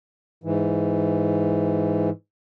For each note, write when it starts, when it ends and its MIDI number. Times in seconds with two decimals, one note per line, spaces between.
0.44 2.10 44
0.44 2.10 52